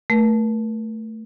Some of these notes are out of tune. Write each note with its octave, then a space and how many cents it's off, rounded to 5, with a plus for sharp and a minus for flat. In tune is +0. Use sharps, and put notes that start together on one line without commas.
A3 +10 A#4 +45